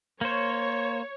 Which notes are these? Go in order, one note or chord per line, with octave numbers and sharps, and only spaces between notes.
A#3 C5 C#5